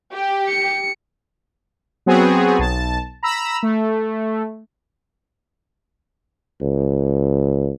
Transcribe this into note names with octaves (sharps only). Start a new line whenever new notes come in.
G4
C#7
F#3 B3 C4 F#4 G#4
B1 A5
A#5 B5 E6
A3
C#2